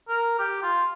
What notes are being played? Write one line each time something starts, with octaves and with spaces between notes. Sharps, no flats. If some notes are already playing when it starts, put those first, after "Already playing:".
A#4
G4
F4